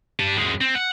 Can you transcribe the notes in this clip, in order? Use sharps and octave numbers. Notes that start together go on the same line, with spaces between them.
G4 A5
F#2 G#3
C4
F#5